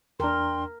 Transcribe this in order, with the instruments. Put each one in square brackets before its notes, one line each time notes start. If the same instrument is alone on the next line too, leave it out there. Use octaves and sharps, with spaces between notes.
[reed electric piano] E2 D4 [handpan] A#4 [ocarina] G5 [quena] C6